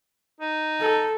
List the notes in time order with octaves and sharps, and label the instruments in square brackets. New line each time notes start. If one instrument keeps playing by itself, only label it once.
[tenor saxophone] D#4
[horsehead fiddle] A4